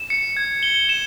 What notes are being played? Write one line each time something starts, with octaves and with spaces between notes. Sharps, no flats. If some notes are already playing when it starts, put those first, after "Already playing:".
Already playing: E7
C#7
G#6
G7
E7